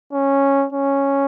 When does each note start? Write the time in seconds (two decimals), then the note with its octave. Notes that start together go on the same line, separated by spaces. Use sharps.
0.13 C#4
0.73 C#4